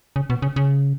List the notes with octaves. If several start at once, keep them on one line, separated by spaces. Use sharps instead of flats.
C#3
B2
C#3
C#3